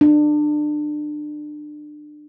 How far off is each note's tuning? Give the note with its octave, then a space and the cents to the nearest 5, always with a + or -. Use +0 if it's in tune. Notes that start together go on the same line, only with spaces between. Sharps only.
D4 +25